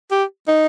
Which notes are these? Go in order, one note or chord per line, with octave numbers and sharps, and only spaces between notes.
G4
D#4